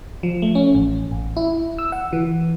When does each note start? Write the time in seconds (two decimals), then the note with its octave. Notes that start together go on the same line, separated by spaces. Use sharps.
0.23 F3
0.42 A3
0.55 C#4
0.74 A1
1.11 A1
1.36 E4
1.78 E6
1.92 F#5
2.13 E3